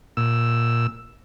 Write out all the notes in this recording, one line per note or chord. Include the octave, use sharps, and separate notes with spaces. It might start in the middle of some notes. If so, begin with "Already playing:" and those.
A#2 E6